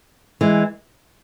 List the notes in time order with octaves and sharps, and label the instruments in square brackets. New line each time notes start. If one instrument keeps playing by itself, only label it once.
[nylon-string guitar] E3 G#3